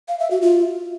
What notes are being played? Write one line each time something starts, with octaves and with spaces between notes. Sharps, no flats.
F5
E5
F#4
F4